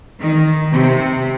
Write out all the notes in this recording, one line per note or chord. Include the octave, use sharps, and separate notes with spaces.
D#3
C3